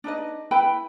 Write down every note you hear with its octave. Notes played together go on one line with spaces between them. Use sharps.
D4 D#4 B4 D#5
E4 B4 G5 B5